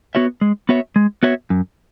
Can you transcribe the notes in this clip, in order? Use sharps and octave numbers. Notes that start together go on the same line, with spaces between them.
B3 F#4 C#5 E5
G#3
B3 F#4 C#5 E5
G#3
B3 F#4 C#5 E5
F#2